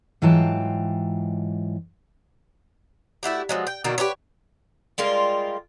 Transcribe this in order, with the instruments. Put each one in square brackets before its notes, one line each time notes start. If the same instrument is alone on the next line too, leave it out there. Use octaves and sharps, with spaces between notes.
[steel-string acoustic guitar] G#2 E3 F#3 F4 G5 A5
[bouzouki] A3 E4 F#4 G4
F3 F#3 G#3
G5
B2 D3 D#3 A#3
G4 A4 B4 C#5
G3 G#3 A#3 F4